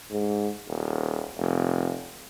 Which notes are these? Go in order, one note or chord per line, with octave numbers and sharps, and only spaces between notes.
G#2
D#1
F1